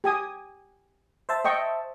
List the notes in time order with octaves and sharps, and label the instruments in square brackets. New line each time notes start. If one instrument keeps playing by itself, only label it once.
[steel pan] G4 G#5 D#6
[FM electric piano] C5 E5 A5
[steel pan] D#5 G5 C#6